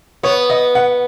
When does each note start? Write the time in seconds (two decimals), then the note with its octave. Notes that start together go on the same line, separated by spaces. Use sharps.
0.23 B3 C#5
0.50 D#5
0.75 F#5